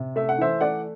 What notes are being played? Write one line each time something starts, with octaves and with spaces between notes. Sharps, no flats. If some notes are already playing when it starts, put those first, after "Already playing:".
Already playing: C3
A3 E5
F#5
E3 C5 E5
A3 D5 F#5